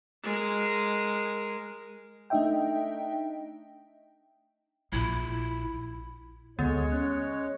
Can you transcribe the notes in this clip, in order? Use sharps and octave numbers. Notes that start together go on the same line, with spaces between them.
G#3 A#4
A3 D4 D#4 D#5 E5 G5
A#1 E4
D2 G#3 B3 C#5
C#4 F#6